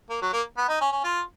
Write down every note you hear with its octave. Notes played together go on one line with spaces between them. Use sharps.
A#3
F#3
A#3
B3
D#4
C#4
C#4
F4